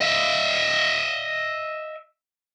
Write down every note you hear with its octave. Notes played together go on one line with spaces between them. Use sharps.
D#5 E5